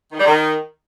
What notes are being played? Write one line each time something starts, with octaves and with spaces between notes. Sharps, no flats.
D#3
G3
D#3